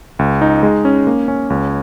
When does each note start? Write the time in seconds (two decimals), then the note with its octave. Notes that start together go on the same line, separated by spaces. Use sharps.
0.19 C#2
0.41 D#4
0.63 G#3
0.85 C#4
1.07 A#3
1.28 C#4
1.50 C#2